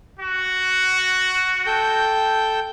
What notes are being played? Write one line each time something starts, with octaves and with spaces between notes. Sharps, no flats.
F#4
A4 G5 G6